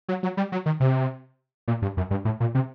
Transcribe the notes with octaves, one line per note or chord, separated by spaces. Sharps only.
F#3
F#3
G3
F#3
D#3
C3
A#2
G2
F#2
G2
A2
A#2
C3